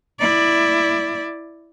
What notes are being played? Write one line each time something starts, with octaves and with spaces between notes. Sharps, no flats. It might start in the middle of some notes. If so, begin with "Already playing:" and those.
E4 D5